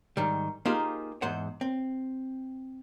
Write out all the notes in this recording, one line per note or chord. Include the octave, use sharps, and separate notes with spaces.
G#2 D#3 G3
A#3 D#4 F4 G4 G#4 C5
E2 G#2 C5 F#5
C4